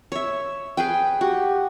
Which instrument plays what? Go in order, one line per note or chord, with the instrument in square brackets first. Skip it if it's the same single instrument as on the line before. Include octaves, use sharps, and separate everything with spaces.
[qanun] C#5 E5
G#4 B4 G5
[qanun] F#4 [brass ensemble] G4